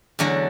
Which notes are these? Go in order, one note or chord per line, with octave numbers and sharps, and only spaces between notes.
E2 D3 F#3 A3 F#4